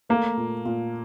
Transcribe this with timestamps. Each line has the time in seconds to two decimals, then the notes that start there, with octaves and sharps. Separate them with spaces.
0.09 A3 A#3
0.37 A#2
0.65 A#2